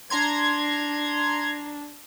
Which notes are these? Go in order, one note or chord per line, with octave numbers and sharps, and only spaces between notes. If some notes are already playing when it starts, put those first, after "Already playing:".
D4 A#5 C6 G#6